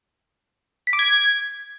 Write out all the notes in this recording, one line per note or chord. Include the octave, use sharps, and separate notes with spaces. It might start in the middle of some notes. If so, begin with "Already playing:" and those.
B6
D6
G#6